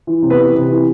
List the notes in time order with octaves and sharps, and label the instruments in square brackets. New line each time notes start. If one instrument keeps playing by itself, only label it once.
[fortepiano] E3
C3
B3 B4
E3
C3
E3